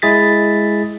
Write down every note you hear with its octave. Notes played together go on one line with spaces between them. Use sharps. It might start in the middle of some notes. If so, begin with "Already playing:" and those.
G#3 E4 G#4 A6 B6